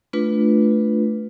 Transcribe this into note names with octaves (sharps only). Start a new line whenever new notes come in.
A3 D4 F4 B4